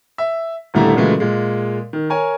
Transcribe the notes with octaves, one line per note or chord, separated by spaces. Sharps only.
E5
D#1 D3 G3 A3 E4 A#5
A#2 C#3 E3 F#3 G#3 A3
A#2 G#3
D#3
A#4 C#5 G#5